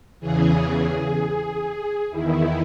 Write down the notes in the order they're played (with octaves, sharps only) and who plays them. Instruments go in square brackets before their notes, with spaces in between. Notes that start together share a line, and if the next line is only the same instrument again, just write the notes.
[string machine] E2 C#3 E3 G#4
E2 D#3 E4